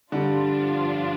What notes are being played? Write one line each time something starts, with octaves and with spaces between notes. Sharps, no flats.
G2 D3 F3 G3 D4 F4